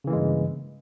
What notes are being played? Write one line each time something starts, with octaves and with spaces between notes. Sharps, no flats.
G2 C#3 E3 G#3 A#3